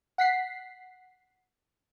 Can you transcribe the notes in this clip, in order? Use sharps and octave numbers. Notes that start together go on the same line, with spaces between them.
F#5 B6 C7